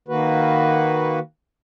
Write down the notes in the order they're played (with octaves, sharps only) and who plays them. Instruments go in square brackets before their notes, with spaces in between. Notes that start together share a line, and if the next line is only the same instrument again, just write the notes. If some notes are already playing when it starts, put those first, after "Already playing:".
[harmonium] D#3 A#3 F#4 B4